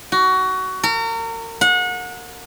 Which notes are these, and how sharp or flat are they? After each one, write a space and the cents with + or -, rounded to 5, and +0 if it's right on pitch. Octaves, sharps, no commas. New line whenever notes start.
F#4 +20
A#4 -35
F#5 -30